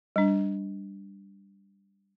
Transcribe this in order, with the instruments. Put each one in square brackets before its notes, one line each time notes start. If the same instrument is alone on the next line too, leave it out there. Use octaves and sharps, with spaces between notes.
[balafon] G3 D4